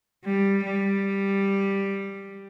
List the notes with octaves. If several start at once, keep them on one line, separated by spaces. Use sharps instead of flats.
G3
G3